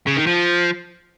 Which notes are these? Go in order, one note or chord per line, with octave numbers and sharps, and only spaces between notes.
C#3
D#3
F3